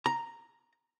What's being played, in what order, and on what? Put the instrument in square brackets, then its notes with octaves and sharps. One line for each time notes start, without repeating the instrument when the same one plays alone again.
[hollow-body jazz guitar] A#5